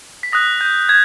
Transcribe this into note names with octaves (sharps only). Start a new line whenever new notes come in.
B6
D#6 F#6 A#6
G6
G#6